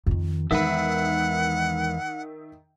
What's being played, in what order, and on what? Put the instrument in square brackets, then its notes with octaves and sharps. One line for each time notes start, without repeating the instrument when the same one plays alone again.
[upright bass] F2 D#3
[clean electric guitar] E2 B4 [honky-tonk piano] D#3 E5 [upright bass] G#3 [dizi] F#5